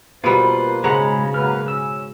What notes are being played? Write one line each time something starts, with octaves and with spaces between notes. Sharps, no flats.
B2 G3 A#3 F4 B4 C5
G#2 C#3 G#3 F#5 A#5 B5
F#3 A#3 B4 F6
C#4 E6